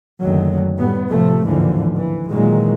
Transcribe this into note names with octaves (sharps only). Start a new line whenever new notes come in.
F#1 D2 D#3 F#3
A2 G3 B3
A1 A2 C3 F3 A3
A1 D#2 G#2 D3 E3 F3
E3
A#2 D#3 E3 F#3 G#3